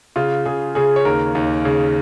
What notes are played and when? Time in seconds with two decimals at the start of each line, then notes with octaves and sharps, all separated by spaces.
0.16 C#3 F4
0.46 C#3 G#4
0.75 C#3 G#4
0.96 C#5
1.05 D#2 A#4
1.35 D#2
1.65 C#3